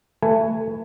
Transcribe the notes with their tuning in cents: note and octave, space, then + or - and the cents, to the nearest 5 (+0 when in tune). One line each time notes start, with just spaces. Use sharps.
A3 +20 B4 +0 G#5 +0